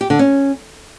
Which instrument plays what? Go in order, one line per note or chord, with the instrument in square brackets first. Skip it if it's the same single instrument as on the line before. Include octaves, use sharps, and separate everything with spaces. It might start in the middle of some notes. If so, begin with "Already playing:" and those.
[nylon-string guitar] G4
D3
C#4